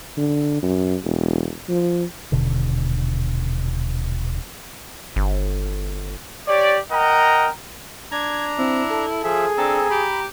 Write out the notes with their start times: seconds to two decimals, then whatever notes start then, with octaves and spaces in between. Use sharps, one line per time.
0.17 D3
0.63 F#2
1.04 E1
1.69 F3
2.32 D#1 B2 D3
5.16 G1
6.48 G4 C#5 D5
6.92 A#4 D#5 F#5 G5 A#5
8.12 D4 A#5 G#6
8.58 C4 E4
8.90 A4
9.24 F3 G#4 E5
9.57 C4 D4 A4 A5 A#5
9.90 G4 B5